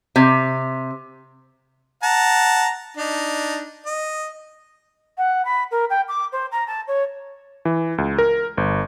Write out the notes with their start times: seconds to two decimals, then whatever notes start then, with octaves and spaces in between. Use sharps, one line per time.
0.16 C3
2.03 F#5 A5 A#5
2.97 D4 D#4
3.86 D#5
5.18 F#5
5.45 B5
5.71 A#4
5.90 G5
6.08 D6
6.32 C5
6.52 A#5
6.67 A5
6.87 C#5
7.65 E3
7.98 C#2
8.18 A#4
8.57 G1